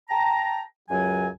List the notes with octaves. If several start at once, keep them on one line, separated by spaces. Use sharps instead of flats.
G5 A5 A#5
C#2 F#2 F#3 G#5